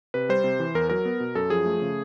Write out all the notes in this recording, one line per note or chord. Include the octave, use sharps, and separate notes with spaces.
C3 B4
G3 C5
C3
E3
E2 A#4
F#3 A#4
B3
B2
F#2 A4
F3 G#4
A3
C#3